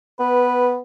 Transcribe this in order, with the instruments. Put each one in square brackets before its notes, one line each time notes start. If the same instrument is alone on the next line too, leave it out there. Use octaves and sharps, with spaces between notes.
[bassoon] B3 [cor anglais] B4